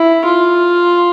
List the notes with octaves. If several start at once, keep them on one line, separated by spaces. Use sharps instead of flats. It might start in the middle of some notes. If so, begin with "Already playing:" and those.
Already playing: E4
F4